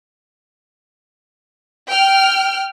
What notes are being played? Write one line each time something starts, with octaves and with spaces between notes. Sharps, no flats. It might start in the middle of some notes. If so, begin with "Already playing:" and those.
G5 F6